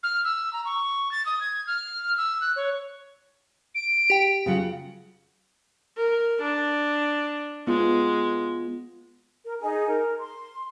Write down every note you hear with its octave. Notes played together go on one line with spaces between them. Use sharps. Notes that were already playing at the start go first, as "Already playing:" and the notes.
F6
E6
A#5
C#6
A6
D#6
G#6
F6
E6
F#6
C#5
D7
G4 G5
C#3 F#3 F4 F#5
A#4
D4
G#3 B3 F4
A#4
D#4 G#4 G#5
A#4
C6